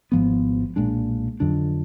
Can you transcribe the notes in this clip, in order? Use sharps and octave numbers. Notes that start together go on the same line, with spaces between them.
G#1 G#2 F3 B3
B1 A#2 G#3 D4
F2 D3 F#3 D4